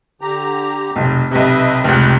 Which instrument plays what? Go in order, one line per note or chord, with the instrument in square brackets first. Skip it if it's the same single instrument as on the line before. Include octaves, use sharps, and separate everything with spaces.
[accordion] D3 G4 A#5
[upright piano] F1 B1
[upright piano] B1 C3 [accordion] B4 D#5 E5
[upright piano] F1 C#2 [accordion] F6 F#6